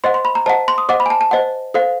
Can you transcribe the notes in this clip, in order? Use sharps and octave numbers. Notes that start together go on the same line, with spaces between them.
C5 D#5 F#5 C6
C6
B5
A#5
C5 D#5 F#5 A5
C6
D#6
C5 D#5 F#5 D6
B5
G#5
A5
A5
C5 D#5 F#5
A4 C5 F5